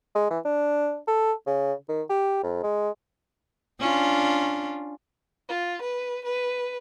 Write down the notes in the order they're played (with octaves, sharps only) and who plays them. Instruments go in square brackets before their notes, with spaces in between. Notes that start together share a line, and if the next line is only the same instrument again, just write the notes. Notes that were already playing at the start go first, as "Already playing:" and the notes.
[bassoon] G#3
E3
D4
A4
C#3
D#3
G4
F2
G#3
[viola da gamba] C#4 D4 F4
[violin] F4
B4
B4